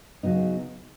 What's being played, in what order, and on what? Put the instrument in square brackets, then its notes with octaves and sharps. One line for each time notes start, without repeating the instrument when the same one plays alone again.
[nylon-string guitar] C#3 F#3 B3 D#4